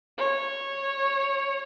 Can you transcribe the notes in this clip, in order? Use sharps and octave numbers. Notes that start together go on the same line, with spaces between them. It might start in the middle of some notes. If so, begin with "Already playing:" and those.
C#5